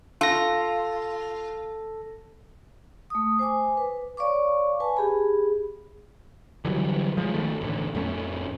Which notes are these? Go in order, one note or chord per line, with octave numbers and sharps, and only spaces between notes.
F4 A4 A#6
A3 D#6
C5 G#5 D6
B4
C#5 D5 F5 C#6 D6
B4 G#5 A5
G4 G#4 B5
D3 E3 F#3 G3
F3 G#3
D#3 A3
A1 A2 D3
F2 A2 A3 C#4